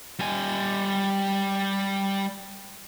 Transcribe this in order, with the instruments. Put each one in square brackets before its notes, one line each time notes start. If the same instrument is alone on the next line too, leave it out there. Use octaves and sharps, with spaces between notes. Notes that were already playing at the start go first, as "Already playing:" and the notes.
[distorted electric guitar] G3 G#5